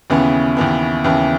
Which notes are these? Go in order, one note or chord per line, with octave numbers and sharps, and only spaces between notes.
D#2 C#3 E3 B3
D#2 C#3 E3 B3
D#2 C#3 E3 B3